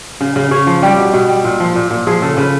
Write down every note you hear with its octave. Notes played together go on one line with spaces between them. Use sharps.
C#3
C#3
C#3 C#5
F3
G3 G4
B2
B2
G3
A#2
F3
A#2
A#2
F3 G#4
C#3 A4
C#3 B4